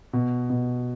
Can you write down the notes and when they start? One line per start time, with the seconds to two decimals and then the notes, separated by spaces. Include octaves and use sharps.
0.13 B2
0.50 B2